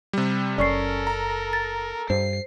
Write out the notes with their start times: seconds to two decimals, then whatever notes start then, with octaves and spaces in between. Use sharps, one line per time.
0.13 C3 G3
0.58 F#1 C#4 A4 A#4 D5 C#6 C7
1.07 A#5
1.53 A6
2.10 G2 C5 C7